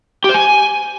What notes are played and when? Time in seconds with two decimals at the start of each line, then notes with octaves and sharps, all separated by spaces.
0.24 G4
0.29 C5
0.34 G#5